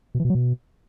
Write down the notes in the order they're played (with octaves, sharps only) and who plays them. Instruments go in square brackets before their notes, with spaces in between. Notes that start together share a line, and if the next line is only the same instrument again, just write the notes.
[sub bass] B2
E3
B2
F#3
B2